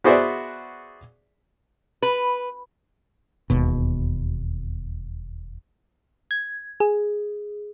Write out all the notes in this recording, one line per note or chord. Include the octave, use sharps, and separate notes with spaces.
B3 F#4 G#4 C5 D5 E5
B4
E1 D#2 B2
G#6
G#4